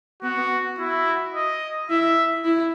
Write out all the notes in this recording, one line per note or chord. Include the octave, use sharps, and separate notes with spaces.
B3 F#4
E4 F#4
D#5
E4 E5
E4